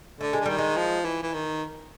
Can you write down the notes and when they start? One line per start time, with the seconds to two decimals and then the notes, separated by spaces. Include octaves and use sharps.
0.21 D3 A3
0.33 G#3
0.41 D3
0.46 D#3 G3
0.58 G#3
0.77 F3
1.05 E3
1.23 E3
1.34 D#3